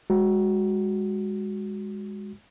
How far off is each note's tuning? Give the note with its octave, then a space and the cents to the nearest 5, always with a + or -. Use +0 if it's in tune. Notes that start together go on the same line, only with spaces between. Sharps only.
G#3 -20 F#4 +0